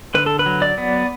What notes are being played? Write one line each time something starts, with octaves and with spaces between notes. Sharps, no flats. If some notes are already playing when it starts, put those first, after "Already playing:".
D3 B4
A4
B4
F#3
D5
B3